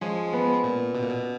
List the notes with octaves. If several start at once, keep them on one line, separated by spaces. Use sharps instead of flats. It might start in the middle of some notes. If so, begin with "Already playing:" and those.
F3 G#3 C#4
B3
A#2
B2
A#2
B2